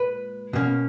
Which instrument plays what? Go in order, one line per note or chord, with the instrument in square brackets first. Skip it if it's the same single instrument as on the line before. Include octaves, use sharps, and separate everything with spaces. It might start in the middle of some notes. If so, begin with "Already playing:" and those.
Already playing: [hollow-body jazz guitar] A#2 G#3 B4
B2 A#3 C#4